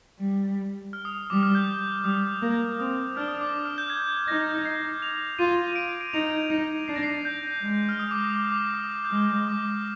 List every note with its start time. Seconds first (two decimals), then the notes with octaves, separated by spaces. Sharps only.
0.19 G3
0.93 F6
1.05 D#6
1.30 G3 D6
1.43 F6
1.55 G6
2.04 G3 D#6
2.42 A#3
2.79 C4 D#6
3.16 D4 F6
3.28 D#6
3.41 D6
3.65 F6
3.78 G6
3.90 G#6
4.28 D#4 A#6
4.65 C7
5.02 F7
5.38 F4 D#7
5.76 D7
5.89 D7
6.01 D7
6.13 D#4 F7
6.50 D#4 F7
6.88 D4 C7
6.96 A#6
7.03 C7
7.25 G6
7.62 G#3
7.89 F6
7.99 D#6
8.11 D6
8.23 D#6
8.36 D6
8.44 D#6
8.52 D6
8.74 D#6
9.05 G6
9.11 G#3 F6
9.48 D6